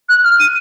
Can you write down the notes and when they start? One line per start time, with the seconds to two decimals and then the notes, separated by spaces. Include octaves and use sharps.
0.09 F#6
0.24 F6
0.40 D#7